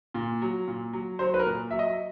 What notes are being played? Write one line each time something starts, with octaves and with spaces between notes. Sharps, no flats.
A#2
F#3
A#2
F#3
F#3 C5
B4
A#4
A#2
F#3 E5
D#5